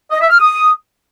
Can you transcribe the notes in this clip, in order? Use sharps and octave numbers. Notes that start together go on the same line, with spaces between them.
D#5
E5
F6
D#6